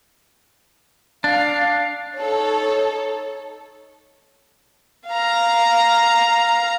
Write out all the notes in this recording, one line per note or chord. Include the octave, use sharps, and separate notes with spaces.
D4 F5
D#4 A4 C#5
F5 A#5